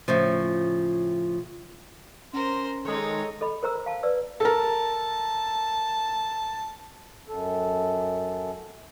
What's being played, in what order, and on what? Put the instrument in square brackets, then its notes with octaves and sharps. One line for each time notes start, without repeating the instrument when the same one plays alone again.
[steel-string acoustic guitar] A2 C#3 F3
[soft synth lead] C#4 [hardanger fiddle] A#4 C5 [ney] C6
[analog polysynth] D#3 G#3 [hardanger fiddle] D#4 C#5 [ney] A4
[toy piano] A4 D#5 B5
A#4 C5 A#5 E6
F5 A5
B4 D5 E6
[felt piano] A4 A#4 [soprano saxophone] A5
[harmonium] F#2 A4